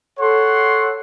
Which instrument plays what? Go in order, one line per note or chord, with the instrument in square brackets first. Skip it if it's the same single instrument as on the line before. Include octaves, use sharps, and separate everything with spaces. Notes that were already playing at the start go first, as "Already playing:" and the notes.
[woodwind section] A4 [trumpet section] C#5 F#5 C6